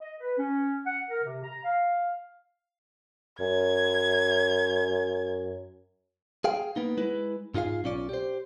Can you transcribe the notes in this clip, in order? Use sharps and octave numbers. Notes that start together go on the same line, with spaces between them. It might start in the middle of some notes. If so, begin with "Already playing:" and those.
D#5
B4
C#4
F#5
A#4
C3
A#5
F5
F#2 G#6
G#4 F5 G5
A#3 B3 D#4
G#3 E4 B4
G#2 D#4 F4 G#4 F5
B1 C#4 F4 D5
G4 C5